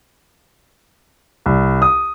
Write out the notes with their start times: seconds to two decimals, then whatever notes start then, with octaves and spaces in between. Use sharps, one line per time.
1.46 C2
1.82 D#6